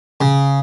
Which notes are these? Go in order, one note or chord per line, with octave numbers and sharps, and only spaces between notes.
C#3